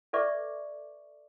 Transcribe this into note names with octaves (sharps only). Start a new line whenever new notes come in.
A4 B4 D5 E5 C#6 D6